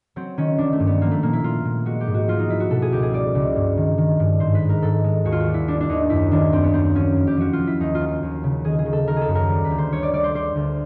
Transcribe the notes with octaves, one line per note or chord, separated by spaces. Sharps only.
F#3 C4
D#3 C#4
D#3 D4
A3
G2
B3
F3 A#3
A3
A#2 A#3
E4
A#2 F4
A#2
G#3 F#4
G4
G#2
F#4
F3 F4
D#4
F3 E4
F#4
B2 A4
G#4
C#2 G4
G#4
G3 D5
C#2
G2
D#3
D#3
G2
G#2 C5
B4
G#3
A#4
G#2 A4
G#3
D#2 F#4
F4
F#4
G3
E4
G3 D4
D4
D#2 D#4
F#2 E4
D#3 D4
F#2 C4
B3
F#2 C4
C4
F3 C#4
F2
G4
F3 F#4
F4
F3
E4
D#2 D#4
F4
F#3
F4
D#2
C#3
D#3 G#4
G#4
D#3
A4
D#3 A#4
G#4
A4
F#2
A#4
G3
B4
D2
C5
G3 C#5
D5
G3 D5
C5
G3 C5
D2